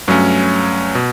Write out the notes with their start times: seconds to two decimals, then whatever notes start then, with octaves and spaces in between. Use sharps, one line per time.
0.08 G2 F#3 A3 C#4
0.95 B2